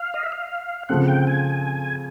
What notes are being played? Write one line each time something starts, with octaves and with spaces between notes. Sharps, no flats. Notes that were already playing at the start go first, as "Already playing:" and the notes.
Already playing: F5
D#5
E5
F5
C#3 F3 A3 C4 F#5
G5
G#5